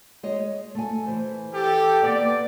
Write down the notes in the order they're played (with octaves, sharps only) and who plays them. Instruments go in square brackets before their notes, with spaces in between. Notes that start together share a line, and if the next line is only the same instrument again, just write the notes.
[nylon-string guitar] G#3 C#5 D#5
A3 G#5
E3 C5
[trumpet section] G4 A4
[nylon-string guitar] A#3 B3 [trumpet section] D5